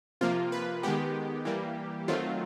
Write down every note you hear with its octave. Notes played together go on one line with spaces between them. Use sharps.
C3 F3 A#3 F4
B4
D#3 G#3 B3 G4
E3 G3 A#3
D#3 F#3 A3 C4 F4